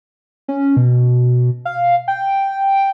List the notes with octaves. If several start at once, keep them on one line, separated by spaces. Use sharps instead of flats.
C#4
B2
F5
G5